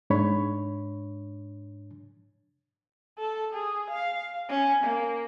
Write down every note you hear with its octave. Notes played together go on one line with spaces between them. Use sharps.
G#2 D4 C#5 B5
A4
G#4
F5
C#4
A#3